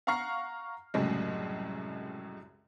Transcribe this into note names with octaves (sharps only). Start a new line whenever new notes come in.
F5 F#5 A#5 C#6 F6 C7
C2 F#2 A2 C#3 G#3